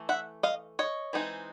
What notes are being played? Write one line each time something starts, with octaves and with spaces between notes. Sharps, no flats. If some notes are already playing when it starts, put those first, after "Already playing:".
Already playing: E3 A3
E5 F#5
D#5 F5
C#5 D#5
E3 G#3 C4 D#4